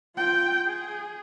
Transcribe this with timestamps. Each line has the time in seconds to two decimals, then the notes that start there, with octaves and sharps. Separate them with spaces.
0.15 F4 G5
0.65 G#4